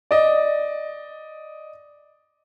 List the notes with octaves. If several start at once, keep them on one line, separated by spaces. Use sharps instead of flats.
D5 D#5